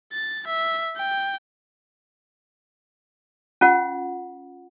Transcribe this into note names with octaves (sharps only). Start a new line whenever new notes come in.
A6
E5
G5
C#4 F4 F#5